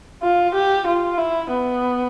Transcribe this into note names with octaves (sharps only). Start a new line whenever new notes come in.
F4
G4
F4
E4
B3